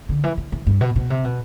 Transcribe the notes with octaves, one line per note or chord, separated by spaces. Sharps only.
D3
E3
E3
E3
G2
B2
B2
C3
B2